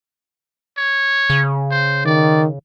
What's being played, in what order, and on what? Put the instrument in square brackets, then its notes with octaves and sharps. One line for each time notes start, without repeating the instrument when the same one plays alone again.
[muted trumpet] C#5
[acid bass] C#3
[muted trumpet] C5
[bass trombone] D#3 [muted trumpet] D5